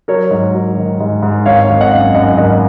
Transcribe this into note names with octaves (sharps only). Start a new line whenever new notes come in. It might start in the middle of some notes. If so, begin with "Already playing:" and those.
F#3 A#4 C#5
G#2
F#3
D#3
G#2
G#2
G#1 C#5 F5
G#1
D#5 F#5
F#2
F#2 D#5 F#5
G#1 D#5 F#5